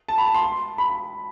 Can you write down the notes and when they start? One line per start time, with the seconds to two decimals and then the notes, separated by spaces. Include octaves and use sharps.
0.08 A5
0.18 B5
0.26 A5
0.34 C6
0.78 B5